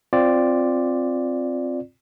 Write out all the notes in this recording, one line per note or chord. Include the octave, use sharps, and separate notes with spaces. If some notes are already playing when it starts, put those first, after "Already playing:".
C4 F4 D5